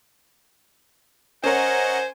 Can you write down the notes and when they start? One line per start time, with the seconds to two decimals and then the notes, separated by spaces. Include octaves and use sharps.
1.44 C#4 A#4 C5 C#5 D#5 F#5 G#5